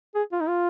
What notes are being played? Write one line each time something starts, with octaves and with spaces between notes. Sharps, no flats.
G#4
F4
D#4
F4